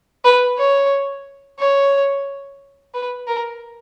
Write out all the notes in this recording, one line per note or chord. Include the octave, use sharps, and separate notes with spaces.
B4
C#5
C#5
B4
A#4